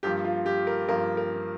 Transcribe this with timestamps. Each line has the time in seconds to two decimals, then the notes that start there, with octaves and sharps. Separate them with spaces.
0.03 G2 F3 A#3 G4
0.25 F4
0.46 G4
0.67 A#4
0.88 G2 F3 A#3 A#4
1.17 A#4